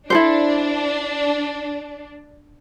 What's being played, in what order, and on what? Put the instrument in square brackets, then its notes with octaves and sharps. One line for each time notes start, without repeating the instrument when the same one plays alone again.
[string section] D4 [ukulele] E4 A4 C5